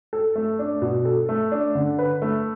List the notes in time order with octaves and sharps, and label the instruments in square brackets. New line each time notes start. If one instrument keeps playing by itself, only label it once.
[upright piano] A4
A3
D4
B2
A4
A3
D4
D3
B4
A3